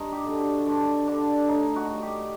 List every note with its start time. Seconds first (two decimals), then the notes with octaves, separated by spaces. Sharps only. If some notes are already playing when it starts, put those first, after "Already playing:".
Already playing: G2 D#4
0.12 G4
0.25 D3 G3
0.40 F#4
0.66 G2 D4
1.07 D3 G3 D4
1.48 A2 D#4
1.76 F#4
1.89 G3
2.02 G4